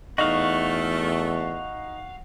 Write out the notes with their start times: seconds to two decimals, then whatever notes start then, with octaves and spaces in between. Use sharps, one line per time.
0.18 E2 A3 D#4 F#4 F5